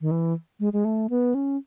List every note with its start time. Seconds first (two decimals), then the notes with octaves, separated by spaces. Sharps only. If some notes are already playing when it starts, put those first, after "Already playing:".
0.01 D#3
0.11 E3
0.60 G#3
0.73 G#3
0.85 A3
1.10 B3
1.35 C#4